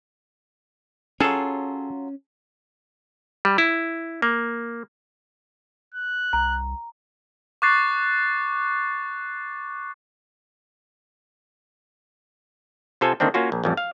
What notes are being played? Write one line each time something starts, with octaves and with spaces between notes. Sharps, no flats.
F#3 C#4 F4 G#4 A4
G3
E4
A#3
F#6
C2 A#5
C#6 D6 F#6 A6 C7
C3 F4 A4 C5 F5 G#5
D3 D#3 A#3 C4 D4
A#3 C#4 F4 F#4
A#1
A1 F2 G3
F5